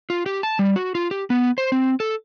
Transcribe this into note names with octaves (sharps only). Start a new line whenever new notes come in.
F4
G4
A5
G3
F#4
F4
G4
B3
C5
C4
A4